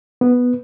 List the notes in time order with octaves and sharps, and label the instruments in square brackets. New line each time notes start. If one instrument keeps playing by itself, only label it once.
[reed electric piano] B3